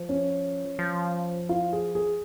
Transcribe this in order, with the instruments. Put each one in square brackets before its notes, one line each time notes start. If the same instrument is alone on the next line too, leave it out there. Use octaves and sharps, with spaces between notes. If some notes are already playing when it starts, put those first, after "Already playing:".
Already playing: [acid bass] F3
[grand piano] C#4
[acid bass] F3
[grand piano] F4
G#4
G#4